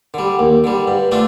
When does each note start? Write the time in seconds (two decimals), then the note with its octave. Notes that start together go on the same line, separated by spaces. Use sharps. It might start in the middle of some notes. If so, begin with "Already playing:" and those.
0.14 D3 G3
0.39 D#2
0.64 D3 G3
0.87 G2
1.12 D3 A3 D4 F4